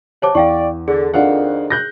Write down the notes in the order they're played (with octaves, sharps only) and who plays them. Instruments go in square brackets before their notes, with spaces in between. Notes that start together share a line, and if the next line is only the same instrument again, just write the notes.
[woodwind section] C3 F#3 [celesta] C#5 A5 D6
[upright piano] E2 [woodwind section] D5 [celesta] F5 G5 C#6
[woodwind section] D3 [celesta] G#4
[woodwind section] F2 D#3 [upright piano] D4 F5 F#5
[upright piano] F#6 G6 A#6